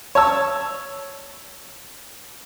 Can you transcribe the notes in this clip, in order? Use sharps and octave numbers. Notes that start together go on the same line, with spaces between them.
C#5 A5 E6